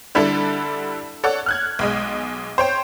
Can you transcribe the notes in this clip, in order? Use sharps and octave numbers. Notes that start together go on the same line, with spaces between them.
D3 G3 D4 E4 A4
A4 C#5 D5 F#5
F6 F#6 G#6
B1 G#3 D#5
C5 C#5 G5